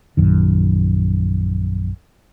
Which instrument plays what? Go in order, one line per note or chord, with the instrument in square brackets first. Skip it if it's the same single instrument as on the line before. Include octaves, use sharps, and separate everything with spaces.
[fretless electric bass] A#1 F#2 D#3